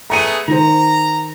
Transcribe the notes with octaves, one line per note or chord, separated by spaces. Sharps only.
A3 B3 G#4 A#5 C#7 D#7
D#3 C5 A#5